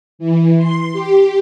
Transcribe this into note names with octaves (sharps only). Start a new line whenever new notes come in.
E3
C6
G4